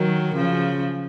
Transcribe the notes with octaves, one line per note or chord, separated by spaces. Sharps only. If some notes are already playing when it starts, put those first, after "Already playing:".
Already playing: D#3 F#3
C#3 F3